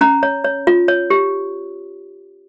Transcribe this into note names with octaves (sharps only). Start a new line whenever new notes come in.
C#4 A#5
C#5
C#5
F4
C#5
G4